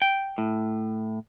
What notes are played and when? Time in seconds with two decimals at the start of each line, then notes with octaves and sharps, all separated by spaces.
0.02 G5
0.38 A2